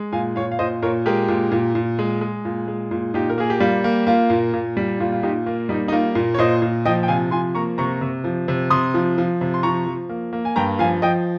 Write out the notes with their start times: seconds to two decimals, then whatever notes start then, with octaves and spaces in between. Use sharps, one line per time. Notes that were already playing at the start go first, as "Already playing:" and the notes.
Already playing: G#3
0.12 A#2 F5 G#5
0.36 A#2 C#5 F5
0.52 F5
0.59 A#2 C5 D#5
0.82 A#2 A#4 C#5
1.06 G#3 G4 A#4
1.28 A#2
1.52 A#2
1.75 A#2
1.99 G#3
2.21 G#3
2.45 A#2
2.68 G#3
2.91 A#2
3.14 A#2 D#4 G4
3.29 A#4
3.38 A#3 G#4
3.50 G4
3.60 G3 F4
3.84 A#3
4.07 A#3 F4
4.30 A#2
4.53 A#2
4.77 G3
5.00 A#2 F4
5.12 F4
5.23 A#2 D#4 G4
5.46 A#3 F4
5.69 G3 D#4
5.88 D#4
5.92 A#3 F4
6.15 A#2
6.34 C#5
6.39 A#2 C5 D#5
6.62 A#2
6.86 F3 D#5 G5
7.03 G5
7.08 C3 F5 G#5
7.31 F3 G#5 C6
7.55 A#3 A#5 C#6
7.78 C3 A#5 C#6
8.01 C3
8.24 F3
8.48 C3
8.70 C3 C6 D#6
8.94 F3
9.18 F3
9.41 C3
9.54 C6
9.63 F3 A#5 C#6
9.86 F3
10.09 A#3
10.33 A#3
10.45 G#5
10.56 G2 G5 A#5
10.79 F3 F5 G#5
11.02 F3 D#5 G5